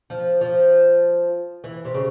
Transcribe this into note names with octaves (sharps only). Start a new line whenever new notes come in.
F3
F3
E3
C3
C#3